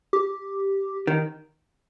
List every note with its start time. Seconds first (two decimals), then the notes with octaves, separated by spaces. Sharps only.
0.13 G4
1.07 D#3